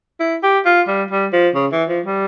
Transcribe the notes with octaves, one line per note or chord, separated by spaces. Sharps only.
E4
G4
F4
G3
G3
F3
C#3
E3
F3
G3